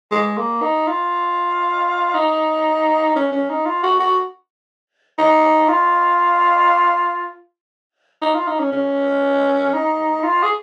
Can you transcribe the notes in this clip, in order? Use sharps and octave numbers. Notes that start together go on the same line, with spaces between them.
G#3
A#3
D#4
F4
D#4
C#4
C#4
D#4
F4
F#4
F#4
D#4
F4
D#4
F4
D#4
C#4
C#4
D#4
F4
G#4